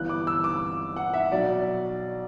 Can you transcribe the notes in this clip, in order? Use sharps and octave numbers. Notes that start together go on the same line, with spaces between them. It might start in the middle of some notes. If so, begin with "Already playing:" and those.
Already playing: G1 G2 E3 B3 E4 F#6
D6
E6
D6
F#5
E5
B1 B2 F#3 D5